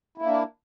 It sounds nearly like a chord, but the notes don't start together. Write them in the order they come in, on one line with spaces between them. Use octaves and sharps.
E4 A#3 D4